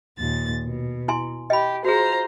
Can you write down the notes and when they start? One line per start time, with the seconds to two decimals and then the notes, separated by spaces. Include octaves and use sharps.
0.18 D#2 A#2 A6
0.63 B2
1.08 E4 G#5 C6
1.50 G4 D#5 B5
1.85 F4 F#4 G#4 C5 A#5